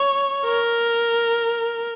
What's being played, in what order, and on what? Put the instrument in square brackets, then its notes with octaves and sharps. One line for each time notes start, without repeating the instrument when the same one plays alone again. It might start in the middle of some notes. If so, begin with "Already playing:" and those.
Already playing: [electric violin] C#5
A#4